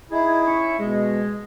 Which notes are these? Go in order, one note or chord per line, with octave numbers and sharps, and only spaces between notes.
D#4 E4 G#4
C#4 E5 C#6
B2 G#3